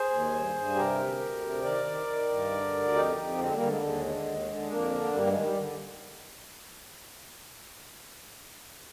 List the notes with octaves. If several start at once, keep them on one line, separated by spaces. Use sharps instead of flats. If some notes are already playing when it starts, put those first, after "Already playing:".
Already playing: G#4 C5
D#2
G2
G2
C3 G4 A#4
D2
D2
C3
D#3 A#4 D5
D#3
D#3
G2
D3
D2
F2 D#4 G4
F2
D3 G#3 C4
G3 A#3
D3
G#3
D#2 G#3
D3
D#2
D3
F2 A#3 D4
D3
G2 G3 A#3
G#3
D#3
G3
D3